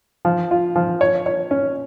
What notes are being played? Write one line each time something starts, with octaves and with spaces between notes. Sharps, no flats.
F3
F4
F3
C#5
C#5
C#4